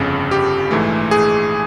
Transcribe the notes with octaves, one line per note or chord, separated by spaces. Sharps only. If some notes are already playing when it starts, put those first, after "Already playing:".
Already playing: G1 F2 C#3
G4
A#1 G#2 E3 A3
G#4